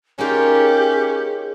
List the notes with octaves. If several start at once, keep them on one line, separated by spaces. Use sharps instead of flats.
A#3 C#4 D#4 F4 G4 G#4